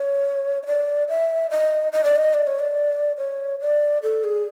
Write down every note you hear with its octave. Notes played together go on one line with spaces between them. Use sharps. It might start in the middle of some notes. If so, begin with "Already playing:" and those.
Already playing: C#5
D#5
D5
E5
D#5
D#5
D5
D#5
D5
C#5
D5
C#5
D5
A4
G#4